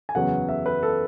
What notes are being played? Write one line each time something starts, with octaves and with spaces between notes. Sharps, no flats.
G#5
F#1 E2 C#3 F#3 B3 F#5
E5
B4
A4